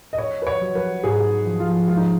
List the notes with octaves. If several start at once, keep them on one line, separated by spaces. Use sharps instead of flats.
D#5
C#4 C#5
B4
C#5
F#3
B4
G#2 G#4
F3
F4
G#3 F4
D#4